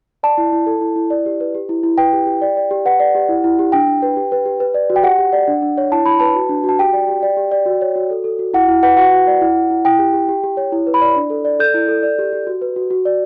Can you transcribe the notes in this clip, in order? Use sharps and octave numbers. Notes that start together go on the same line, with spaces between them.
D5 A5
E4
E4
A4
E4
E4
D5
G4
B4
G4
E4
E4
B4 G5
G4
G4
D5
D5
G4
B4 F#5
D5
G4
E4
E4
G4
D4 G5
D4
B4
G4
B4
G4
B4
D5
F#4
G5
G4 F#5
G4
D5
D4
D4
C#5
E4 A5
E4 B5
B4 A5
F#4
D4
F#4 A5
G4 G5
D5
G4
D5
G4
D5
F#4
C#5
F#4
A4
A4
F#4
E4 F#5
E4
B4 F#5
F#4 F#5
F#4
D5
E4
E4
E4
E4 G5
G4
G4
G4
G4
C#5
E4
B4
B5
D5
D4
A4
D5
A4 G6
E4
A4
D5
G4
G4
F#4
B4
F#4
F#4
D5